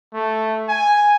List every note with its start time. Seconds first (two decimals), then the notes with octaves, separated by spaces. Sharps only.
0.14 A3
0.69 G#5